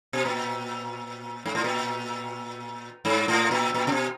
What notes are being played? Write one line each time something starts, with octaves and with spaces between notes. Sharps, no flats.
B2
A#2
G#2
A2
A#2
G#2
A2
A#2
A#2
C3
B2